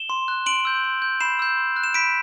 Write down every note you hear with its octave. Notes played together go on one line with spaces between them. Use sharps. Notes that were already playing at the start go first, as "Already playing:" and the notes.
Already playing: E7 G7
C6
F#6
C6 D7 F#7
E6 G6
C6
G6
B5 C7 E7
E6 G6
C6
F#6
E7
B5 B6 D7